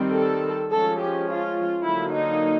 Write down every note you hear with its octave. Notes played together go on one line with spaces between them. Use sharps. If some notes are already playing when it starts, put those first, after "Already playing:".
Already playing: D#3 G3 C4
A4
F3 G#3 C#4 A4
G4
F4
D3 F#3 A#3 E4
D#4